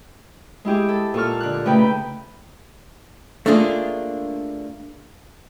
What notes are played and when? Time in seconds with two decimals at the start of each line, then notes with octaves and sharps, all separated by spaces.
0.65 G#3 E4 G4 G#4
0.89 A4
1.14 A#2 A4 C#6 F6
1.40 D3 F#6
1.65 C#3 A3 D#4 B4 G5 B5
3.46 A3 A#3 D4 F4 G#4